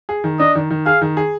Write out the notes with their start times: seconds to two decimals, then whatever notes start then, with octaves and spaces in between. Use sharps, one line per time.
0.09 G#4
0.24 D#3
0.39 D4 D#5
0.55 D#3
0.70 D#3
0.86 G#4 F5
1.01 D#3
1.17 G#4